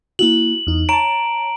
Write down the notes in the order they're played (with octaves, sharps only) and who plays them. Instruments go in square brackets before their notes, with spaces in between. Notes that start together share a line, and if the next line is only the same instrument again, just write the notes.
[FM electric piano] A#3 E4 F#4 [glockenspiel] F#7
[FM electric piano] E2 D#4
[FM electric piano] C#5 A5 [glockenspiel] A#5 D7